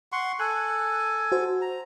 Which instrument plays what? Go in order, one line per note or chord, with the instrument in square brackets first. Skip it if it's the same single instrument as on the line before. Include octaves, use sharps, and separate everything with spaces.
[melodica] F#5 C6 C#6
[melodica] A4 G#5 [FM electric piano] F#6
[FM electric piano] F#4 C5
[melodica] A#5